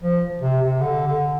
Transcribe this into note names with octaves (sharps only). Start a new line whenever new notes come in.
F3
C3
C3
D3
D3